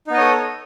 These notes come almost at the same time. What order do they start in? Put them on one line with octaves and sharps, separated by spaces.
D#4 B3 D#5 C#5 A4